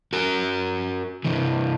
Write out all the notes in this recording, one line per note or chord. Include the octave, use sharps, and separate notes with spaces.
F#4 A#4
C3 E3